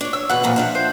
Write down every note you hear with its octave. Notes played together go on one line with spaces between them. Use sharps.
D4 C#5
C#5 E6
B2 E3 F#5
F2 A#2 E3
F3 D4 E5
C5